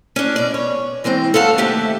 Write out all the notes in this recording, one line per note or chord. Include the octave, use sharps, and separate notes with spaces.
C#4 D4
B2 D5
C#5
E3 G#3 C4 G5
A4 B4 C#5 F5 F#5 A5
D#2 C3 A3 G4 E5